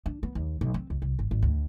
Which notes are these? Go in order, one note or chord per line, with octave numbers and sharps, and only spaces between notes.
D4
B3
D#2
B1
C4
C#2
C2
G#1
G#1
D2